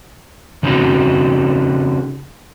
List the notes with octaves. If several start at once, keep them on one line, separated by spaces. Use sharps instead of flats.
C#3 C4 C#4 D#4 F#4